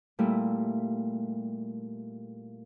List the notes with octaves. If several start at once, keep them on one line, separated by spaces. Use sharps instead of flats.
A#2 G3 A3 E4